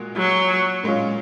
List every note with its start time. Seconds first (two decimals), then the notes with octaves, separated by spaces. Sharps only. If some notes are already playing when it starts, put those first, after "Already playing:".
Already playing: A#2 G#3 F#4
0.16 F#3
0.83 A#2 G#3 C#4 F4